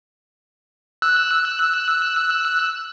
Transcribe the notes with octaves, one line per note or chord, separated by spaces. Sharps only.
E6 F#6